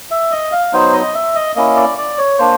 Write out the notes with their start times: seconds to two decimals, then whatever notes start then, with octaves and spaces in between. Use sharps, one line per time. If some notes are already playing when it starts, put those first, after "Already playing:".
0.11 E5
0.32 D#5
0.52 F5
0.73 F#3 B3 D#4 C5
0.93 D#5
1.15 E5
1.35 D#5
1.56 A#3 C#4 E4 D#5
1.76 D5
1.98 D5
2.18 C#5
2.39 A#3 D4 C5